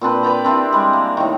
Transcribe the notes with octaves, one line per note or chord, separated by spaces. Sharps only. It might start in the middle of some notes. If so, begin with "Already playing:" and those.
A#2 C4 D4 B4
B4 D5 G5 A#5
C4 D4 E4 G4
G3 G#3
A#3
A2 D#3